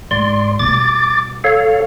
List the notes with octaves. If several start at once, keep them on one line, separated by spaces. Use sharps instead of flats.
G#2 D5 C6
B2 G3 D6 A6
A4 C#5 F5